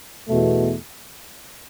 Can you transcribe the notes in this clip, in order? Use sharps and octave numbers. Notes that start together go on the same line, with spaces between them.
E2 B2 A3